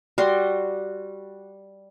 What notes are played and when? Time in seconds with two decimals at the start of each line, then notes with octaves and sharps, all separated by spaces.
0.18 G3 F#4 C6